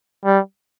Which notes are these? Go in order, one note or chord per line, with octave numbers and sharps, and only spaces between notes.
G3